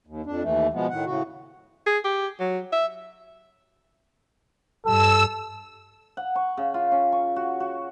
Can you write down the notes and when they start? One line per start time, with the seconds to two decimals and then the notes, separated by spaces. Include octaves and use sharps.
0.07 D#2
0.26 F2 D4
0.43 D#2 E3 A3
0.73 B2 F3 G#3 B3
0.90 A2 D#3 F#5
1.06 A2 C#3 F#4
1.86 G#4
2.04 G4
2.40 F#3
2.72 E5
4.86 G2 A4 E6
6.17 F#5
6.35 C#6
6.57 C#3
6.74 F4
6.92 C#4
7.12 C#6
7.36 F#4
7.60 F#4